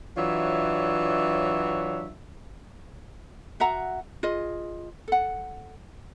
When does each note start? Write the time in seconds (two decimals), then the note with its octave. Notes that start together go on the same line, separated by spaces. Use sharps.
0.18 E3 F#3 D4 F4 C#5 E5
3.60 F#4 E5 F#5 A#5
4.23 F4 G#4 D#5
5.08 A4 F#5